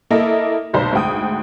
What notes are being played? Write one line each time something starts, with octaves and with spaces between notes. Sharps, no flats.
A#3 E4 A4 D#5
F1 B1 C5
D2 G#2 G5 D#6